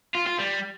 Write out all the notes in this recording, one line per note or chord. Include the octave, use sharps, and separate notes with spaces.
F4
F4
G3